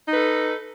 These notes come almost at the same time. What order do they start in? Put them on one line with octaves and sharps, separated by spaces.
D#4 B4 A4